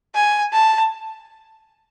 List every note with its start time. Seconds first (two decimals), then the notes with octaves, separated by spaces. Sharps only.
0.15 G#5
0.53 A5